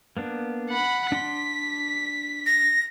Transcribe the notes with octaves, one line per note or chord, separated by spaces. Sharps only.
A#3 B3 D4
F#5 B5
D4 C6 B6
A#6